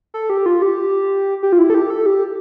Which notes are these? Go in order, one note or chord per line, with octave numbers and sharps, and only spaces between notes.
A4
G4
F4
G4
G4
F4
E4
A4
G4
A4
G4